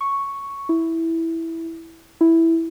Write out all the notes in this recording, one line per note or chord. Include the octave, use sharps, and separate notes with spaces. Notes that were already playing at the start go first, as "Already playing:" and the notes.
C#6
E4
E4